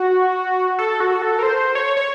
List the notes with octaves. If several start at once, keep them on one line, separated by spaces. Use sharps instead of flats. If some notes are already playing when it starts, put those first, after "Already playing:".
Already playing: F#4
A4
F#4
A4
A#4
C5
C#5
C#5